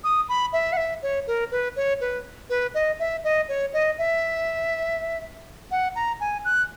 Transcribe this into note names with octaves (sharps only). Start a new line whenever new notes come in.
D#6
B5
E5
F#5
E5
C#5
A#4
B4
C#5
B4
B4
D#5
E5
D#5
C#5
D#5
E5
F#5
A#5
G#5
F#6